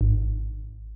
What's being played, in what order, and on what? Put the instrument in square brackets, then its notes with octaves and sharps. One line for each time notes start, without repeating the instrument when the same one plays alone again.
[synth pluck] G#1